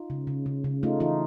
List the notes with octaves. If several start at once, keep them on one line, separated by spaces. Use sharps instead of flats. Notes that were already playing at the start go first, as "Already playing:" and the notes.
Already playing: D#4 F4
C#3
C#3
C#3
C#3
A3 D#4 F4
E3 D#4 F4